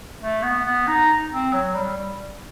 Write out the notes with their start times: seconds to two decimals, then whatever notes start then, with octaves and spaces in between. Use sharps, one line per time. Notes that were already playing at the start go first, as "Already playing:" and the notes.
0.20 A3
0.43 B3
0.64 B3
0.87 D#4
1.31 C4
1.53 F#3
1.75 G3
1.97 G3